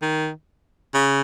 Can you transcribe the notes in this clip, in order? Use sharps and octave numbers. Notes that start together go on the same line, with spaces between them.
D#3
C#3